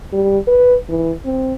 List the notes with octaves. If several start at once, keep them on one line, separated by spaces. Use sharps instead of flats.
G3
B4
E3
C4